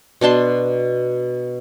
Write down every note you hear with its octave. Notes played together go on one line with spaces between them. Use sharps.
B2 D4 A5 C6